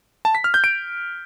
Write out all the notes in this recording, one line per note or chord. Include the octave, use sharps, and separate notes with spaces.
A5
B6
F6
G6
D7